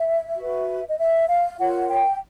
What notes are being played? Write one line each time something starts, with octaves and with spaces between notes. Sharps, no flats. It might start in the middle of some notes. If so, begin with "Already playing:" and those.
Already playing: E5
F#4 B4
D#5
E5
F5
F4 A#4 C#5 F#5
G5